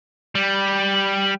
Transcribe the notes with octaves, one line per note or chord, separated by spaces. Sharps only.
G3